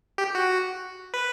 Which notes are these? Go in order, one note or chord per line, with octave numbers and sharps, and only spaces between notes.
G4
F#4
B4